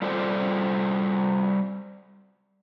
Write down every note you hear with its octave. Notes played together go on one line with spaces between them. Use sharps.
G3 F4 A4 C5 D5